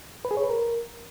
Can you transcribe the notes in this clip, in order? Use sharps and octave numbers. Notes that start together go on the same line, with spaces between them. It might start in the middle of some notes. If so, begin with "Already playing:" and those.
B4
G#4
C#5
B4
A#4